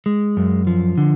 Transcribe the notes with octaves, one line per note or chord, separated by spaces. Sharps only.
G#3
F#2
F3
D3